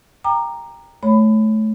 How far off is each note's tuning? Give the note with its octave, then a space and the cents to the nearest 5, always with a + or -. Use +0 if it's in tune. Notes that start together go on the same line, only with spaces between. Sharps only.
G5 +15 A#5 +0 D6 +35
A3 -25 C#5 +0 B5 +20